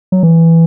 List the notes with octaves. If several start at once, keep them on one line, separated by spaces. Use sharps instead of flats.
F#3
E3